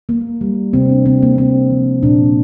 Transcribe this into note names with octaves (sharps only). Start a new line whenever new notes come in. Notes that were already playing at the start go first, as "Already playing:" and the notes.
A#3
G3
C3 C4
D4
C3 C4
A#3
A#3 C4
F3
A#2 D4